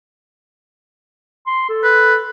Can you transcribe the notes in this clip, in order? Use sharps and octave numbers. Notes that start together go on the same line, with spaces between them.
C6
A4
B4